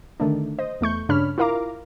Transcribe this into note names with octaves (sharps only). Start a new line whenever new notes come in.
D3 D#3 A3 D4
C5 D#5
E2 A3 C#6 G6
G2 C#3 D4 C#5 B5 F6
E4 F4 A#4 F5 A#5 D6